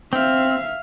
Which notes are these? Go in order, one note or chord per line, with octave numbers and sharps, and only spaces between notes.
C4 E5 F5